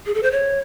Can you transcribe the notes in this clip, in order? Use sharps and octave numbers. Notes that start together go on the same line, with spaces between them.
G#4
A4
C5
C#5